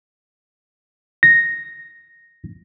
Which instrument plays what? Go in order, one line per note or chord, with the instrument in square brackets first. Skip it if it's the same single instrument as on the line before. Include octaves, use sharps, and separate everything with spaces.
[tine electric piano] A#6